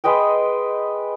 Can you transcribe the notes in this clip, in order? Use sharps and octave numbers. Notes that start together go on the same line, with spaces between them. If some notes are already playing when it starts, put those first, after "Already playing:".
G#3 B4 D#5 G5